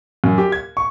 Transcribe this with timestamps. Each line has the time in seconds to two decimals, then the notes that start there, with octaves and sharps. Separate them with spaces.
0.24 F#2
0.38 G4
0.52 G#6
0.77 C#6